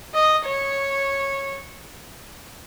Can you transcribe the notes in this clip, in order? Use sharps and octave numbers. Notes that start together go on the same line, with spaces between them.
D#5
C#5